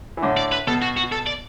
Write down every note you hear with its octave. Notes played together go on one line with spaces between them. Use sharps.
E3
A2 D3
D5
B4
B2 A4
F#4
F#4
A4
D5